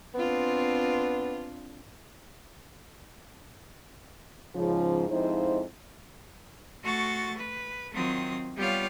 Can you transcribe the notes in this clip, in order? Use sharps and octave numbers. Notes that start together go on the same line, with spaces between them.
B3 C4 D4 F4
G#2 C#3 F3
F2 F3 G#3 D#4 E4 C5
A3 F#4 C6 C#6 A6
B4
D#3 F#3 C4 F4 D#6
G3 B3 F4 G4 C#5 F5